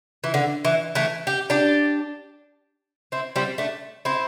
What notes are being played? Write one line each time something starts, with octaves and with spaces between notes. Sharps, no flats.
E3
D3
E3
E3 A3
G4
D4 G4
C4 E4
G3 C4
A3 D4
C4 E4